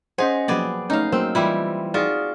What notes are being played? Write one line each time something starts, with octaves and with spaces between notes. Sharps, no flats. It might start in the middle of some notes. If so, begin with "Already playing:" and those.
C#4 G#4 C5 D#5 F#5
F3 F#3 A#3 B3 G#4 D5 G5
A3 C#4 D#4 F5
F#3 A#3 C4 A#4 C5 E6
E3 G3 E4 F4
D#4 F4 F#4 G#4 D5